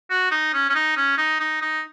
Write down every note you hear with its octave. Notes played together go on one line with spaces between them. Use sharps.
F#4
D#4
C#4
C#4
D#4
C#4
D#4
D#4
D#4